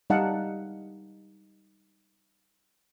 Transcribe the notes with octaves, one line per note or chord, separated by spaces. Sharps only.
G3 D#4 D#5 F5 F#5 A5